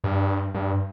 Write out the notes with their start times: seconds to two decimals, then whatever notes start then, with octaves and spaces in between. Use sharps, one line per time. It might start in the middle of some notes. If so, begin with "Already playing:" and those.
0.04 G2
0.54 G2